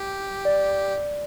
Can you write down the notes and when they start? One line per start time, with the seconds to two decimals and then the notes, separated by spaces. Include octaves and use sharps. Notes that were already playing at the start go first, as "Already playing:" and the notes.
Already playing: G4
0.45 D5